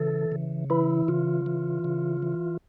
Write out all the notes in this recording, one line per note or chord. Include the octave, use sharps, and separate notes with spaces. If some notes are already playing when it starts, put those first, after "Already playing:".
Already playing: C#3 E3 A4
C#3
E3 E4
C#3 F4
E3
C#3
E3